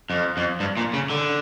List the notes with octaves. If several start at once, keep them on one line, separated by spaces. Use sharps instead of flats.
F2
F2
G2
A#2
C#3
D3